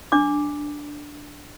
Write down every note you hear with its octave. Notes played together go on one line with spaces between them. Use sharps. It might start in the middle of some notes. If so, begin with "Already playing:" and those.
D4 D6